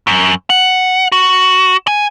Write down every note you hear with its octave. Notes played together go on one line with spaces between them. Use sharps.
F#2
F#5
F#4
G#5